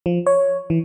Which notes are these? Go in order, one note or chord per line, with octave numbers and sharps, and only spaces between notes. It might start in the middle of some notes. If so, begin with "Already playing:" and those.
F3
C#5
E3